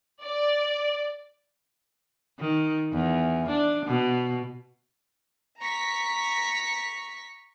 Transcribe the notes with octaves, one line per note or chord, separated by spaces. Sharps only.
D5
D#3
E2
D4
B2
A#5 C#6 B6